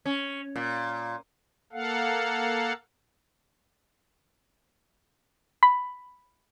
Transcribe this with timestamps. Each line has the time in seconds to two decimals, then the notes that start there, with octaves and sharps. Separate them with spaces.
0.06 C#4
0.56 A#2
1.73 A#3 A4 F5 F#5
5.63 B5